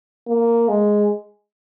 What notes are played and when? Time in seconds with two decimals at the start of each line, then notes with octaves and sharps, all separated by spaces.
0.27 A#3
0.69 G#3